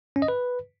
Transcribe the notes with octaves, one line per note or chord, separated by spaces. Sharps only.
C#4
D#5
B4